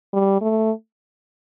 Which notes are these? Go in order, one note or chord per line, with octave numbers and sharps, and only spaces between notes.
G3
A3